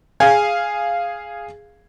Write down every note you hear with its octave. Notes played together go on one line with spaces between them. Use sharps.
G#4 F5 G#5 G#6